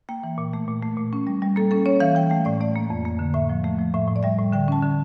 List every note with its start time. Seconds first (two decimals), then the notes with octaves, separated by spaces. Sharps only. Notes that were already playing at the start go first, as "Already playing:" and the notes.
0.09 A#3 G5
0.24 E3
0.38 A#2
0.53 A3
0.68 A#2
0.83 A3
0.97 A#2
1.13 C#4
1.27 G3
1.42 G3
1.56 A#3 A4
1.71 C#4 A4
1.86 C#4 C#5
2.00 E3 F5
2.15 E3 G5
2.30 A3 G5
2.45 A2 D5
2.60 A3 D5
2.76 A#3
2.90 F2
3.05 A#3
3.19 D3
3.34 A2 E5
3.49 F3
3.64 A3
3.79 F3
3.94 A2 E5
4.08 A2
4.16 D5
4.23 G3 E5
4.39 A2
4.53 D3 G5
4.68 C#4 A5
4.82 D3